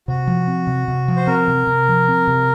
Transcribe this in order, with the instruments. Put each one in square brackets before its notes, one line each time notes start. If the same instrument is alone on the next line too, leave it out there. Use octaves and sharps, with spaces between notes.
[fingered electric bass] C3 [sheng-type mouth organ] F#4
[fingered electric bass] F3
C4
C3
C3
F3
[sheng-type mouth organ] C5
[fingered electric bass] C4 [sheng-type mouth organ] A#4
[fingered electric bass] C3
C3
F3
C4
C3